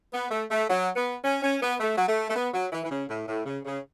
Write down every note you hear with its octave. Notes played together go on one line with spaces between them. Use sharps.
B3
A3
A3
F#3
B3
C#4
C#4
B3
A3
F#3
A3
A3
B3
F#3
E3
E3
C#3
A2
A2
C#3
C#3